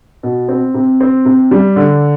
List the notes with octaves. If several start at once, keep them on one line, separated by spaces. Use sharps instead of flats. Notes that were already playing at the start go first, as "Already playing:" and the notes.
B2
C4
C3
C4
C3
G3
D3